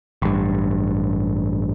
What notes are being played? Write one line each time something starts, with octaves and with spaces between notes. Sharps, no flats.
A1 G2